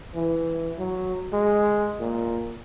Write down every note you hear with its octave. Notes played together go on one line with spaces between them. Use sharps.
E3
F#3
G#3
A#2